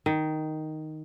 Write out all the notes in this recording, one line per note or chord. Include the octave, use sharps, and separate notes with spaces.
D#3